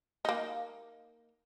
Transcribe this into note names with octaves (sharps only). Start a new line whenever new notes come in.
A#3 D#4